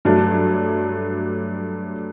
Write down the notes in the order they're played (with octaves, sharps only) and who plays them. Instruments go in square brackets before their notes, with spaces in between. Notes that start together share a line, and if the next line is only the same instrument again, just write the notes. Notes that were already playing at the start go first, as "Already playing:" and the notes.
[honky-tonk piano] G2 F#3 A3 D4